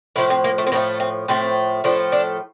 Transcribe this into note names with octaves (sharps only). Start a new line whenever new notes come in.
A2 F3 A3 E4
C4
A#3
A3
C4
A2 F3 A3 A#3
C4
A2 F3 A3 C4
A2 F3 A3 D4
D4